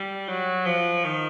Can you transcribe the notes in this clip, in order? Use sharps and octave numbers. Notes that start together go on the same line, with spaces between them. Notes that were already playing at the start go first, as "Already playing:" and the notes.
Already playing: G3
F#3
F3
D#3